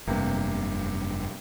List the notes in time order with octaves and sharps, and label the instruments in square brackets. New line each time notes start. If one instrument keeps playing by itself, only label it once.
[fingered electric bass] F1 G2 [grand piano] C3 A#3 B3